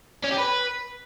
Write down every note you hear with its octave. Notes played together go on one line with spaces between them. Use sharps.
C#4
G4
B4